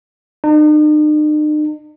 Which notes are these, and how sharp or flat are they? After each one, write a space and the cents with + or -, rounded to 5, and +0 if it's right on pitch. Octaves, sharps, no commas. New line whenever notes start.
D#4 -45